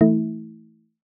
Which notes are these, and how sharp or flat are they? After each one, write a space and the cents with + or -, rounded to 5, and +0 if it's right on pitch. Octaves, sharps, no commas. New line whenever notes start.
E3 +5 A3 +10 E4 -25